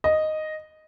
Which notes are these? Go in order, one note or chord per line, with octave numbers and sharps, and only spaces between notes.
D#5